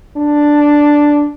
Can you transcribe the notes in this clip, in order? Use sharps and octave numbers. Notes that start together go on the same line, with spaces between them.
D4